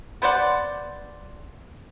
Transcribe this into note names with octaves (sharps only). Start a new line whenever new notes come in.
B3 C5 D5 F#5